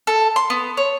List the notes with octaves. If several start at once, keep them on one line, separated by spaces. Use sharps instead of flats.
A4
C6
B3
C#5